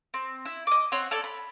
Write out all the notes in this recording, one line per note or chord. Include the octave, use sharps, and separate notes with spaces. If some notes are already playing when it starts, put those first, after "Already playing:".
C4
E4
D#5 D6
C4 C#5 F#5 C6
A4 C#5 D5
B5